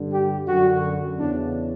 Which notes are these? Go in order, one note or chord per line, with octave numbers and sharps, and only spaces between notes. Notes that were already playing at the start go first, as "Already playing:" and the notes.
Already playing: G2 D3
G4
F#2 D3 F#4
E2 C#3 E3 D4